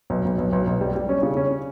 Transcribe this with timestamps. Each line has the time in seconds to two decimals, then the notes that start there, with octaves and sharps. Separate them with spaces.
0.10 B1
0.25 B1
0.38 B1
0.52 B1
0.67 B1
0.81 G3
0.96 G3
1.09 C#4
1.23 C#3
1.37 C#4